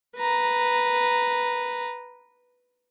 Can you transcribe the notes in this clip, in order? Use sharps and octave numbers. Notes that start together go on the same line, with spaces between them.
B4 A#5